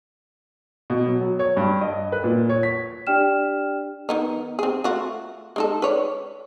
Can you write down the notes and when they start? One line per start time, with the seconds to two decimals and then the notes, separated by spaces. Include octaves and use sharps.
0.90 B2
1.07 F#3
1.21 F#3
1.39 C#5
1.57 G2
1.81 D#5
2.12 B4
2.24 A#2
2.49 C#5
2.63 B6
3.07 D4 G4 D5 G5 F6 E7
4.09 D#3 B3 D#4
4.59 C4 G#4
4.84 A3 F4 F#4
5.56 G#3 D#4 A4
5.82 B4 C#5 D5